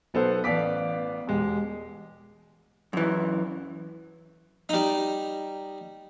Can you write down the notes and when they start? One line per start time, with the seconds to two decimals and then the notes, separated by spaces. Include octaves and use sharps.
0.14 B1 B3 A4 C5
0.44 A1 B3 D5 F5 D6 B6
1.27 E1 G#3 G4
2.93 F#2 E3
4.69 G3 D#4